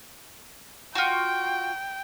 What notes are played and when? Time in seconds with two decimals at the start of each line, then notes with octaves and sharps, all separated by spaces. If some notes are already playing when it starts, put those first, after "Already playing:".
0.95 F4 F#4 G5